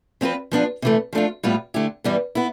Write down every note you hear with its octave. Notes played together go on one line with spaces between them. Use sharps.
F3 C4 F4 B4
F3 B3 D4 F4
C3 E3 A3
F3 A3 D4 F4
A2 G3 B3 F4 B4
D3 A3 E4 G4
G2 E3 G3 B3
B3 E4